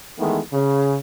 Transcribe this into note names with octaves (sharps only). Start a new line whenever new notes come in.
D#3 E3 G#3 A3 B3
C#3